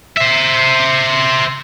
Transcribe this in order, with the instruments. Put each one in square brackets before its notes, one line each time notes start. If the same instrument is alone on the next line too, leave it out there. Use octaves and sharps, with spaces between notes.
[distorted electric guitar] C5 E5